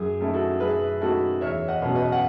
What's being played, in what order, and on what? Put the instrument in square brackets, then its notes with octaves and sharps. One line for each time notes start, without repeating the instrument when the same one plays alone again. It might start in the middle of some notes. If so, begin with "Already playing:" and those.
Already playing: [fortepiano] F#2 G#4
D#3 A3 C#4 E4
F#4 A4
F#2 G#4 B4
D#3 A3 C#4 E4 F#4 A4
E2 C#5 E5
D#5 F#5
B2 F#3 C#4
B4 D#5
F#5